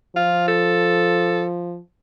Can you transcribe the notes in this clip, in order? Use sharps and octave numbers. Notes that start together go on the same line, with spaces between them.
F3 F4
A4